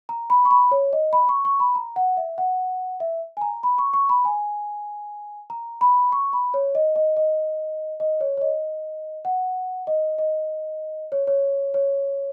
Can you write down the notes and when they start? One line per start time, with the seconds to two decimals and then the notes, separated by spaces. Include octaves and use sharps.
0.09 A#5
0.30 B5
0.45 C#6
0.51 B5
0.71 C#5
0.93 D#5
1.13 B5
1.29 C#6
1.45 C#6
1.60 B5
1.75 A#5
1.96 F#5
2.17 E5
2.38 F#5
3.00 E5
3.37 G#5
3.41 A#5
3.63 B5
3.78 C#6
3.94 C#6
4.09 B5
4.25 G#5
5.50 A#5
5.81 B5
6.12 C#6
6.33 B5
6.54 C#5
6.75 D#5
6.96 D#5
7.17 D#5
8.00 D#5
8.21 C#5
8.37 C#5
8.41 D#5
9.25 F#5
9.87 D#5
10.18 D#5
11.12 C#5
11.27 C#5
11.74 C#5